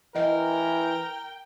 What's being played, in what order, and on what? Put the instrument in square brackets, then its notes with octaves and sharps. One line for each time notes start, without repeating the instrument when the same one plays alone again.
[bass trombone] E3 [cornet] A#4 [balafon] D#5 [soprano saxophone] G5